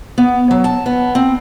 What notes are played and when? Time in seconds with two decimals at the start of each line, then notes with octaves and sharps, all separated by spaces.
0.18 B3
0.51 F#3
0.64 A5
0.86 B3
1.15 C4